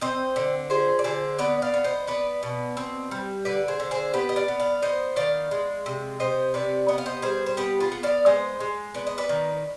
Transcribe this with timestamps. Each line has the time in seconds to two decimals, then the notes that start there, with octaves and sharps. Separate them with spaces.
0.01 C4 C5 D#5
0.36 D3
0.70 F3 G#4 C5
0.99 D5
1.04 D3 G#4 C5
1.39 B3 B4 D5
1.62 D5 F5
1.74 B3
1.84 C5 D#5
2.07 B3 B4 D5
2.43 B2
2.77 C4
3.11 G3
3.45 D3 B4 D5
3.68 G#4 C5
3.80 D3
3.91 G#4 C5
4.14 B3 G4 B4
4.29 D#5
4.36 D5 F5
4.48 B3
4.60 D5 F5
4.82 B3 C5 D#5
5.16 D#3 D5 F5
5.51 G#3
5.86 C3
6.20 C3 C5 D#5
6.54 C3 B4 D5
6.88 B3 D#5
6.98 F5
7.06 C5 D#5
7.22 G3 G#4 C5
7.46 C5
7.57 B3 G4 B4
7.80 F4 G#4
7.92 B3
8.03 D5 F5
8.26 G#3 C5 D#5
8.60 G#3
8.94 B3 D5
9.07 D#5
9.18 B4 D5
9.29 D#3